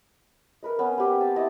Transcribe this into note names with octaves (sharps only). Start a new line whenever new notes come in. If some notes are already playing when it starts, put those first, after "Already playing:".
A#4 B4 D#5
B3 C#4 A#4 B4
B3 C4 G4 D#6
G5
A5
E4 D#5 A5